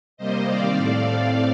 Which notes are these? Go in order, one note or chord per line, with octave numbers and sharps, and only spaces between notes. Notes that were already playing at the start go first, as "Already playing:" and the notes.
C3 G3 A#3 C5 D#5
D#3 G3 C4 D5 F5
A2 A3 C4 D5 F5